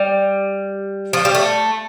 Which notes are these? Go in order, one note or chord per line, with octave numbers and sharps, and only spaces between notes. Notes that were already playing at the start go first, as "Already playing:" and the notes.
Already playing: G3
F3
G3
A3